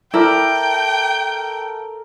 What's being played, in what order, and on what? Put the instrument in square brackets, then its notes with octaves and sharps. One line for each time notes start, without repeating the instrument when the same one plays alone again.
[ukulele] E4 [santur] A4 A#4 D5 [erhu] G5